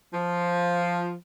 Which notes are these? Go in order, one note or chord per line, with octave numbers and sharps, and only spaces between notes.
F3